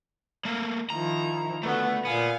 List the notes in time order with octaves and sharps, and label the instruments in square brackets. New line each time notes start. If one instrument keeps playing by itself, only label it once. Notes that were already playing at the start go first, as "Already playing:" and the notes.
[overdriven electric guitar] A3 A#3
[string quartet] D#3 F3 E4 [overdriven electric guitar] A#5
[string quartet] D3 F#4 B4 [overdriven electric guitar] A3 [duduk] B3
[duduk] A#2 [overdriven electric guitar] B3 [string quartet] F5 G#5